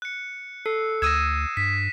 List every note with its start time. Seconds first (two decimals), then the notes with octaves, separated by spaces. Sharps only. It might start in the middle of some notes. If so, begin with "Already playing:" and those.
0.02 F#6 C#7
0.66 A4 C7
1.02 D2 D#6 E6 G#6 A#6 D#7 E7
1.57 G2 B6